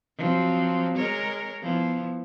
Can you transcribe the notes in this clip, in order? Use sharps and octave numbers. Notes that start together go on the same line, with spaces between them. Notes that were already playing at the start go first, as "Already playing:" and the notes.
F3 F#3 C4
G#3 A#4 C#5
F3 B3 E4